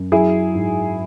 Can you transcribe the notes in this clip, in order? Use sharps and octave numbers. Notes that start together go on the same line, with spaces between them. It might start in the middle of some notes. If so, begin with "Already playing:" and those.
Already playing: F#2
F#3 E4 G#4
G#2